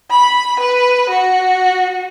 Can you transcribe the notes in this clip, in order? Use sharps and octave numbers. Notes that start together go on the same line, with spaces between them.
B5
B4
F#4